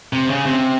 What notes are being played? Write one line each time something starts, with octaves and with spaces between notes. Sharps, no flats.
C3
C#3
C3